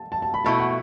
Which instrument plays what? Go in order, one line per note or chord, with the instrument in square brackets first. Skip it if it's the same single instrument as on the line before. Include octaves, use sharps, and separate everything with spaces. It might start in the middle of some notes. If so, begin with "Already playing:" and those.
Already playing: [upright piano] A5
A5
A5
B5
[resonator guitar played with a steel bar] B2 A3 E4 [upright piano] A5
[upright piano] F#5